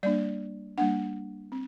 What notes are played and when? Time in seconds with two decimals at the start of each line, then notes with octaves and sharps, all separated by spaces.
0.03 G3 A#3 D4 D5
0.78 G3 A#3 D4 F#5
1.52 C4